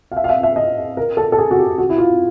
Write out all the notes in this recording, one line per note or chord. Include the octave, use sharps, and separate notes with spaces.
F5
E5
F5
E5
E5
D#5
A#4
A4
A4
G#4
F#4
G4
F#4
E4
F4